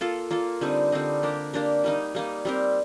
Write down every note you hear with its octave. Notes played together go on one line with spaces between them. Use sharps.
A#3 F4 A4
A#3 F4 A4
D3 G3 C4 D#4
D3 G3 C4 D#4
A#3 D4 G4 A#4
A#3 D4 G4 A#4
G3 A#3 D#4
G3 A#3 D#4
G3 C4 G4 A#4